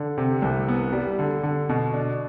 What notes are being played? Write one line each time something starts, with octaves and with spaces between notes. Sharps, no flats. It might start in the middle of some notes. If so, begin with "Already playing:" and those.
Already playing: D3
C3
C2
B3
G3
D3
D3
B2
D4